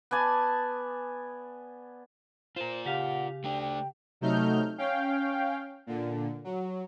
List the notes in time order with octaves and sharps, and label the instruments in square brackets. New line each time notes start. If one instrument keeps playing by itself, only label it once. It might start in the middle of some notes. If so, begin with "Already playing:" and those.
[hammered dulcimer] B3 D5 G#5 A5
[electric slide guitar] F4 A#4 [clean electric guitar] C5
[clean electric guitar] C#3 G4 F5 [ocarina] F#5
[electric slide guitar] A3 D4 [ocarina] G5
[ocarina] G5
[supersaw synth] C3 F#3 A3 D#4 F6 G6
C#4 F5 G5
A#2 D3
F#3